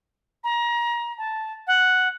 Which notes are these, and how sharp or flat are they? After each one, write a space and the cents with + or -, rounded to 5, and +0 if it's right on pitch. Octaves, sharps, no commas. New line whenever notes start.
A#5 +30
A5 -5
F#5 +0